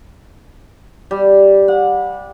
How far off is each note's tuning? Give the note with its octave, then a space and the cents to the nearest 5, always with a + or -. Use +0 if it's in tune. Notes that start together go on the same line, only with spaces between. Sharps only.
G3 +0
F#5 -35